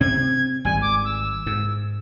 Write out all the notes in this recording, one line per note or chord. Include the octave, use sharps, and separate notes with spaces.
C3 C4 G#6
G#1 G3 G#5
D6
E6
G#2